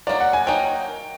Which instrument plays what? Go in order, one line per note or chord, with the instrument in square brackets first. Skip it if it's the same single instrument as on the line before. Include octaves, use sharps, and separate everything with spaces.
[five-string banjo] F#3 A#3 D#4 [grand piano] D5
[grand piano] F#5
G#5
[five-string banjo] F#3 A#3 D#4 [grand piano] G5